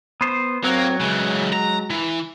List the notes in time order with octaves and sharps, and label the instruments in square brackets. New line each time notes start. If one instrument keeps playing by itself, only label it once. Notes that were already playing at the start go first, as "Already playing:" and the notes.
[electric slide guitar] B3 C5
[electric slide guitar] F#3 [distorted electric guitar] A#3 [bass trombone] C4
[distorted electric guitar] C#3 E3 [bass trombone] G#3
[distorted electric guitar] A#5
E3